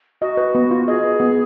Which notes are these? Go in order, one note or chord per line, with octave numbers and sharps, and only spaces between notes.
F#4 D#5
B4
B3
F4
G#4 D#5
B4
B3